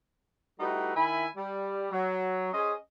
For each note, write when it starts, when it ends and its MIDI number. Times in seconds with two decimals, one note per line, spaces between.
0.60 0.95 55
0.60 0.95 57
0.60 0.95 63
0.60 0.95 64
0.60 0.95 66
0.60 0.95 71
0.96 1.27 51
0.96 1.27 64
0.96 1.27 76
0.96 1.27 80
0.96 1.27 83
1.37 1.89 55
1.91 2.49 54
2.53 2.74 61
2.53 2.74 68
2.53 2.74 72
2.53 2.74 75